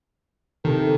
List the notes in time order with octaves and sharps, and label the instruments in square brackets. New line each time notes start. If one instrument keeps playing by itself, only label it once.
[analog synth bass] C3 [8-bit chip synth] D#3 [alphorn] A4